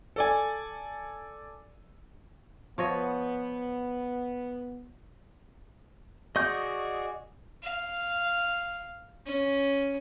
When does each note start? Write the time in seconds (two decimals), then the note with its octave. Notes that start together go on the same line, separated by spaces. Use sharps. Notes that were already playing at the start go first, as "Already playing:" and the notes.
0.16 A4 D5 G#5
2.78 F3 B3 C#5 D#5
6.36 F#4 G#4 D5 D#5 C#6 G6
7.63 F5
9.27 C#4